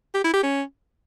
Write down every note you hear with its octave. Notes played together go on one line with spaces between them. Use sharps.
G4
E4
G4
C#4